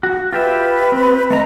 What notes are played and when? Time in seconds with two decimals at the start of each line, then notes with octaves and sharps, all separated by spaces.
0.03 F#4
0.33 F4 G4 B4 E5
0.92 C4
1.30 A3 C4 D#5 A#5